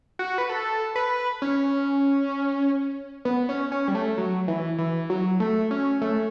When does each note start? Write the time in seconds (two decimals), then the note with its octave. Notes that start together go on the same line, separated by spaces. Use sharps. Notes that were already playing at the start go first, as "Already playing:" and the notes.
0.19 F#4
0.38 B4
0.49 A4
0.96 B4
1.42 C#4
3.25 B3
3.49 C#4
3.72 C#4
3.88 G3
3.95 A3
4.17 F#3
4.48 E3
4.78 E3
5.10 F#3
5.40 A3
5.71 C#4
6.01 A3